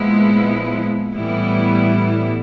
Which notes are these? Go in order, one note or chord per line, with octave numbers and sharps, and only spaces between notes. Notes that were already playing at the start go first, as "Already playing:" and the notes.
Already playing: A#2 F3 G#3 B3 E4
A2 E3 G3 B3 E4